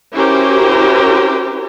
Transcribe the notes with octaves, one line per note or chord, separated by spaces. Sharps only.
C#4 E4 F#4 G4 A#4 C5